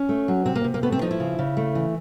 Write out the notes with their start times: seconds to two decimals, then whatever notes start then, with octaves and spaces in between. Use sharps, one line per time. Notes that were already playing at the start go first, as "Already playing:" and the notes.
Already playing: C#4
0.09 A3
0.28 F#3
0.45 C3 C4
0.55 A#3
0.64 C3
0.74 A#3
0.83 A3 B3
0.92 C4
1.02 F3 D#4
1.11 E4
1.20 C#3
1.39 C#3
1.57 A3
1.75 E3